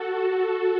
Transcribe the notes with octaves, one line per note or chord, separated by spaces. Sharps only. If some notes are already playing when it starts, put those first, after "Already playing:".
Already playing: F#4 A4